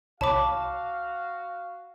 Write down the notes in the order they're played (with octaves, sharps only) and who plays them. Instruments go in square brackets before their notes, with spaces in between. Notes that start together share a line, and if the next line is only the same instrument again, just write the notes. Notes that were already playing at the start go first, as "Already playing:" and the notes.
[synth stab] C2 C#5 B5 [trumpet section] F#4 F5 [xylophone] A5 D6